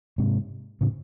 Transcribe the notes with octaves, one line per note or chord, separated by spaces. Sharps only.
G#2 C3
A2 C#3